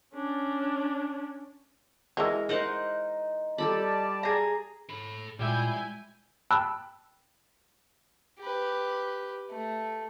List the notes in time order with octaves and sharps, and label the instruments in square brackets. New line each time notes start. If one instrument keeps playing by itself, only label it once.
[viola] C#4 D4
[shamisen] E3 G#3 [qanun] A#4
[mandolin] D#4 [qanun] A#4 C5 F#5
[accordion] G3 D5 A5 [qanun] G4 A4 B5
[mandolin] G#4 A#5
[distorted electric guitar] A4 B5
[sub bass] A#2 [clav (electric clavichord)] G3 G4 E5 [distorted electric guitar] G#3 [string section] E4 G#5 G6
[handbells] G5 A5 B5 E6 F#6
[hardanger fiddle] G4 B4
A3